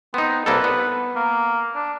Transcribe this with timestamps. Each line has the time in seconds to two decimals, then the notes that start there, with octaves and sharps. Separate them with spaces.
0.14 B3 C4 D#4
0.46 C2 A#3 A4 B4
0.64 B3
1.16 A#3
1.75 D4